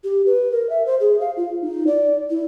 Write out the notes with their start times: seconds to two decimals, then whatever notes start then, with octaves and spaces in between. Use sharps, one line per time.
0.04 G4
0.26 B4
0.52 A#4
0.70 E5
0.86 C5
1.00 G#4
1.20 F5
1.37 F4
1.62 D#4
1.87 D5
2.30 E4